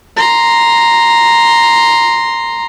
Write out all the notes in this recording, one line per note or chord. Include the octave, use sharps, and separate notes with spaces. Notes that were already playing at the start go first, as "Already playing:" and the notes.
A#5 C6